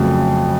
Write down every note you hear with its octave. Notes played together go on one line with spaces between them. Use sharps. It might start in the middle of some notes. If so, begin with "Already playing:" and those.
Already playing: F2 C#3 F#3 A3